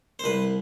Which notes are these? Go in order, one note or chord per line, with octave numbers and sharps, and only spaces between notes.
C5
C2 B4